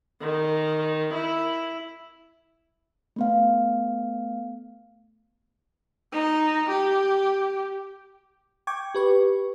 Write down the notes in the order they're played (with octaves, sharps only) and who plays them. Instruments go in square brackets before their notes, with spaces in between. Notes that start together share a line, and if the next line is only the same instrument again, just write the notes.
[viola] D#3
E4
[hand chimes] A3 B3 F5
[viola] D#4
G4
[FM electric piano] G5 C#6 D6 G#6
G4 B4 C#6